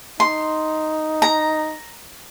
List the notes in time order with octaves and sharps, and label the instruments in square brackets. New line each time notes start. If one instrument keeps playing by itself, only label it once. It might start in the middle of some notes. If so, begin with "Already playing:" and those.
[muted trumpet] D#4 [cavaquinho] C6
[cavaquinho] A#5